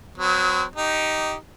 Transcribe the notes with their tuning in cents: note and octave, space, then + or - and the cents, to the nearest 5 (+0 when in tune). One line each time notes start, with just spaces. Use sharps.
F#3 -15 C4 -40
D#4 +0 G4 -15